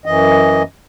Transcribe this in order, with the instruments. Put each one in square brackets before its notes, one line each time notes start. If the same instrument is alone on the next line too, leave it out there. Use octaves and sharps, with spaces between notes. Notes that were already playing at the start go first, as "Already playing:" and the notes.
[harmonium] F#2 E3 D#5